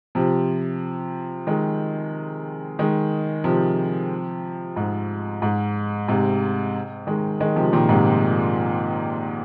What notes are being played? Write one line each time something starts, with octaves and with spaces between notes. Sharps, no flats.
C3 F3
D#3 G#3
D#3 G#3
C3 F3
G#2
G#2
G#2 C3
D#3 G#3
D#3 G#3
C3 F3
A#2 D#3
G#2 C3